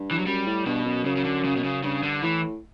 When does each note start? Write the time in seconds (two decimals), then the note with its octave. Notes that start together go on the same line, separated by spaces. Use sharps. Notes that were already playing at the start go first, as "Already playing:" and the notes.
Already playing: G2
0.11 E3
0.19 F#3
0.26 F#2 G3
0.46 A2
0.66 G2 B2
0.85 F#2
1.05 F#2 C#3
1.16 C#3
1.25 D3
1.44 C#3
1.56 B2
1.64 C#3
1.83 G2 C#3
2.03 D3
2.22 A2 E3